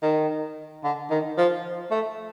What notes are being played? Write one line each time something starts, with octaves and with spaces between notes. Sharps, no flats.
D#3
D3
D#3
F3
A3